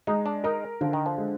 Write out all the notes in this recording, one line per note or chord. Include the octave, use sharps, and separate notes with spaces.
G#3 D#4
D4
D#4 A#4
D3 F3
D#3
F3
G#3